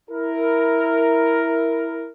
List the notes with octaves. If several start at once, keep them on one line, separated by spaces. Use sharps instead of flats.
E4 A#4